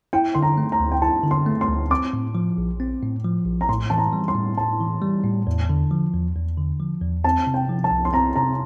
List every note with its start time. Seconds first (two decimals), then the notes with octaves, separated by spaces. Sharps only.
0.13 E4 G5
0.34 D3 C6
0.42 A#5
0.58 A3
0.72 A#5
0.80 D2
0.92 G5
1.02 E4 A5
1.24 D3
1.31 C6
1.46 A3
1.61 C6
1.68 D2
1.91 C4 D6
2.13 A2
2.35 F3
2.58 A#1
2.80 C4
3.03 A2
3.24 F3
3.46 A#1
3.61 A#5
3.69 A2 C6
3.90 E3 A5
3.98 A#5
4.13 G3
4.28 C6
4.35 A2
4.57 A2 A5
4.80 E3
5.02 G3
5.24 A2
5.47 E2
5.69 D3
5.91 F3
6.13 E2
6.35 E2
6.57 D3
6.80 F3
7.02 E2
7.24 C4 A5
7.47 C3
7.54 G5
7.69 F3
7.84 A5
7.91 C2
8.05 C6
8.13 C4 A#5
8.36 C3 A#5